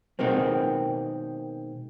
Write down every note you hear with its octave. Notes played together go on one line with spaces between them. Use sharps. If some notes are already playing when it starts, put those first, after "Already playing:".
B2 D#3 G#3 A#3 C4